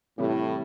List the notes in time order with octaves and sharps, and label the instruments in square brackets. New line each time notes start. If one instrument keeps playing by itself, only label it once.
[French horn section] A2 [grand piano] C3 E3 G3